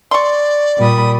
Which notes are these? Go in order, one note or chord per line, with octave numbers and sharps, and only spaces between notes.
D5 C6 C#6
A#2 G3 B5 D#6